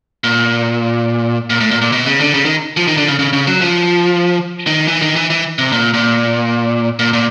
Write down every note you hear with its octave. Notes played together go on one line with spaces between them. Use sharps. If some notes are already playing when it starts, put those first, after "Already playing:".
A#2
A#2
A2
A#2
A#2
B2
C#3
D3
C#3
D#3
F3
D#3
D3
C#3
C#3
C#3
F#3
F3
D#3
E3
D#3
E3
E3
C3
A#2
A#2
A#2
A#2